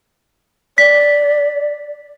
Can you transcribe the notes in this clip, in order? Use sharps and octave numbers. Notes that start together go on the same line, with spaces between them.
D5 B6